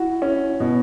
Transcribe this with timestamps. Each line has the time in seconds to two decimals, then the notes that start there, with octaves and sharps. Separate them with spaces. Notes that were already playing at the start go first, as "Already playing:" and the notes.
Already playing: E4 F#4
0.22 C#4
0.60 B2